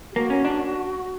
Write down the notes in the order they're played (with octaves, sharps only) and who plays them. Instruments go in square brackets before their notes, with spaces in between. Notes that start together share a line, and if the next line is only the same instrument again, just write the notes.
[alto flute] G4
[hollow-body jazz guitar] A#3 [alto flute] F#4
[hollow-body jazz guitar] C#4
D4